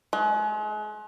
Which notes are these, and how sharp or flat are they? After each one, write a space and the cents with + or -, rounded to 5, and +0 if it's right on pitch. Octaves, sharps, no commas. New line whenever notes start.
G#3 +35